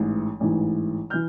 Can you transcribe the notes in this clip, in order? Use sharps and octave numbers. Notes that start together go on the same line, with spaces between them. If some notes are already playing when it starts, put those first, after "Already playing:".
Already playing: A1 G#2 E3
A1 G#2 E3
E3 F6 G6